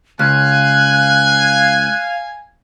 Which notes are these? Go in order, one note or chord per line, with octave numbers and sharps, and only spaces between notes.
C#2 F5 G#5 F#6